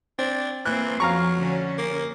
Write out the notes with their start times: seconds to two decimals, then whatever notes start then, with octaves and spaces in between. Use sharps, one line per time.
0.19 C4 D4
0.65 E3 A#3 C4 F#6
1.00 F2 F#3 F5 A#5 C#6
1.38 D3 C#4
1.78 A#3